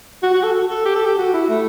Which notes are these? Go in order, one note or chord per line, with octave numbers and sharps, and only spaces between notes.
F#4
F#4
A4
A4
G4
A4
G4
F#4
E4
A3